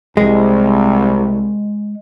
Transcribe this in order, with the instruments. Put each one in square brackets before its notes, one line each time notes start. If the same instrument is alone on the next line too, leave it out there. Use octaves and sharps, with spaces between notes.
[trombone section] C2 [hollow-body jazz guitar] G#3